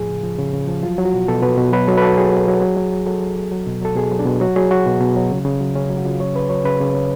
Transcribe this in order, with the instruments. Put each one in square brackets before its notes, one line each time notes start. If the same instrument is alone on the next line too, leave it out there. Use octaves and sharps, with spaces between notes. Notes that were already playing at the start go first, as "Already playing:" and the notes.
Already playing: [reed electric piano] A2 F3 G#4
C#3
F3
C#3
C#3
F3
F#3 F4
F#3
F#4
B2
B2 A4
B2 B4
B2
F#3 B4
F#3 A4
B4
F#3 A4
F#3 G#4
F#3
F#3
F#3
F#3
F#3
F#3 A4
F#3
F#3
F#3
B2
F#3 A4
B2 G#4
F#3
D4
B2
F#3 F#4
F#3 G#4
F#3 F#4
B2
B2
F#3
C#3
C#3
F#3
C#3 C#4
F#3
F#4
C#3 F4
F#3 C#5
C#3 B4
F#3 C#5
C#3 B4
C#3
C#3